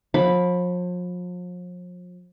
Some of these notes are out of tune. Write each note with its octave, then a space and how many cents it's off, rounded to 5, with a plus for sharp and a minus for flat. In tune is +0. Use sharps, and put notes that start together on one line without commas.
F3 +40 B5 +0